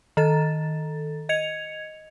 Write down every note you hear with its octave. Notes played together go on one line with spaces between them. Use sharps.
D#3 A4 A6
D#5 G#6 C#7 F7